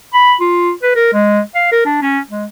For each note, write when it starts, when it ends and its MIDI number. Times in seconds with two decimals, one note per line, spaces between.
0.14 0.35 83
0.40 0.72 65
0.83 0.95 71
0.95 1.12 70
1.14 1.40 56
1.55 1.71 77
1.72 1.84 70
1.85 2.01 62
2.02 2.19 61
2.30 2.45 56